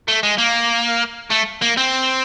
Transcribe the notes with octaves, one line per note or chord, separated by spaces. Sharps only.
A3
G#3
A#3
A3
A#3
C4